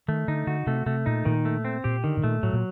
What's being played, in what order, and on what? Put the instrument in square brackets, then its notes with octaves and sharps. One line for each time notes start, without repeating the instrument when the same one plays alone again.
[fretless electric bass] D#3 [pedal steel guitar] A3
[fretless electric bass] D3 [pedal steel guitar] D#4
[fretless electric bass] D3 [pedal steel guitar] F#4
[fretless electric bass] C3 [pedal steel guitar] A3
[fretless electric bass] C3 [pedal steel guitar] A3
[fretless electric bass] A#2 [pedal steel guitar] D#4
[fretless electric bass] A#2 [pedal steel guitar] D#3
[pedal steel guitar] A3
C4
[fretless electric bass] A#2 [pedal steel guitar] G4
[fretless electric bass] D3 [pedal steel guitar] D#3
[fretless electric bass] A2
[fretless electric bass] A#2 [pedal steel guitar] A3
[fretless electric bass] A2 [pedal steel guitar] F#3
[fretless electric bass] A#2